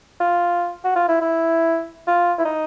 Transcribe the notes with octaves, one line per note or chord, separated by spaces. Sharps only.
F4
F#4
F4
E4
E4
F4
E4
D#4